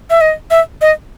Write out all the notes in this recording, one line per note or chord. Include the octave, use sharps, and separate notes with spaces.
E5
D#5
E5
D#5